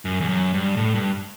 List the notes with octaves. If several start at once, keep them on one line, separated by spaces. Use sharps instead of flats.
F#2
E2
F#2
G2
A2
G2